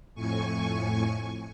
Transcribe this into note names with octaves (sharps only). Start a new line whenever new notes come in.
F2 A2 G#5 C#6